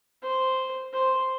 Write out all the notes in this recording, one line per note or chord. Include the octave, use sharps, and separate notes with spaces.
C5
C5